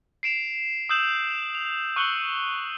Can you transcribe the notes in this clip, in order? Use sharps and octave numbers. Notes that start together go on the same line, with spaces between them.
C7 D7 E7 F7
D#6 E6 G6 E7 F#7
F7
C#6 E6 F#6 C#7 F#7 G7